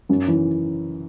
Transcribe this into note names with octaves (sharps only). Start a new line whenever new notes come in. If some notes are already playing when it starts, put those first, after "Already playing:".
F#2
E3